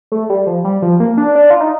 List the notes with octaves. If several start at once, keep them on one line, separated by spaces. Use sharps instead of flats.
A3
G3
F3
G3
F3
A#3
D4
D4
F4
D#4